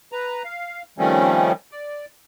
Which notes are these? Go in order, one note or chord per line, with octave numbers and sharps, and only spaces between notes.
B4 A#5
F5
D#3 F3 G3 A3 C4 C#4
D5